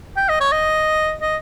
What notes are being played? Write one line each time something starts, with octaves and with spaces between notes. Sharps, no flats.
G5
D#5
C#5
D#5
D#5